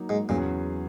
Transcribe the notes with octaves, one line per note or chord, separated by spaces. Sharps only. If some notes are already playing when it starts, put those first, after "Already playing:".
Already playing: F#3 A#3 D#4
G#2
E2 A#2 C#3 F#3 C#4 G#4